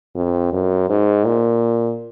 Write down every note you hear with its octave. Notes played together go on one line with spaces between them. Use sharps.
F2
F#2
G#2
A#2